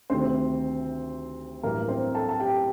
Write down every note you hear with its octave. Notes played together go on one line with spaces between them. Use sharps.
D2 C3 D#3 A3 C4 C5
A1 G2 F#3 A#3 A#4
C4 C5
A4 A5
A5
G4 G5